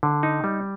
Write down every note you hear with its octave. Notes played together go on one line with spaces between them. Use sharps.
D3
D#4
G3